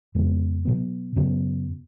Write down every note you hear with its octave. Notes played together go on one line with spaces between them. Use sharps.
F2 C#3 G#3 B3
B2 F#3 B3
F#2 C#3 F#3 B3